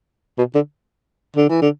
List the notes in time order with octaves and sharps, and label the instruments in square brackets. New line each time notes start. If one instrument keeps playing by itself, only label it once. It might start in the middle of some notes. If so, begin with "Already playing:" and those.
[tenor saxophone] B2
D3
D3
E3
D3